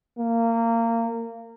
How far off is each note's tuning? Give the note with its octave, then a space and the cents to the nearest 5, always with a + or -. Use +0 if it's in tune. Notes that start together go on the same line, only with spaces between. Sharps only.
A#3 -20